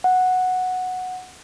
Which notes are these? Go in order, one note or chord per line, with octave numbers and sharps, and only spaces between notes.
F#5